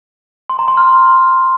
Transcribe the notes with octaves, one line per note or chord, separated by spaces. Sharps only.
C6
A#5
C6
F6